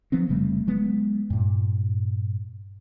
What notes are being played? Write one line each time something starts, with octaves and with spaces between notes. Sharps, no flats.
F3 F#3 B3 C4
F1 C#3 G3 A3
F#3 G#3 B3
G2 A#2